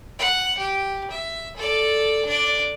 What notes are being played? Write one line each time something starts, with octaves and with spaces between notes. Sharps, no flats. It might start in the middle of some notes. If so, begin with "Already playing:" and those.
F#5
G4
E5
A4 D5
D4 D5